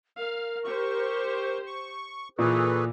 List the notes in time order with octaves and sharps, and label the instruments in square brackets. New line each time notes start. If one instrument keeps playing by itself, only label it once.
[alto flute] A#4 [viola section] F5
[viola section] G4 C5 [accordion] C#6
[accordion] C#6
[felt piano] A#2 [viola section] E3 [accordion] G#4 A4 B4 [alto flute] C#6